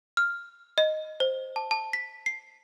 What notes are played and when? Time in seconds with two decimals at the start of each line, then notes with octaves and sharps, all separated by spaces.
0.17 F6
0.78 D#5
1.20 C5
1.56 A5
1.71 A5
1.93 B6
2.26 C7